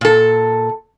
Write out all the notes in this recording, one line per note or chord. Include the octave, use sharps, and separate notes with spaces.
A#2 A4